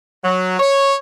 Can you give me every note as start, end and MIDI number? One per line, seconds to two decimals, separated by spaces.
0.24 0.59 54
0.60 0.94 73